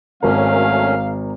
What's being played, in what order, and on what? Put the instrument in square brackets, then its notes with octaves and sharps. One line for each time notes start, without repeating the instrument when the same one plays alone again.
[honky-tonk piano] G#1 A#4 [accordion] F#3 A3 C#4 [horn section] F5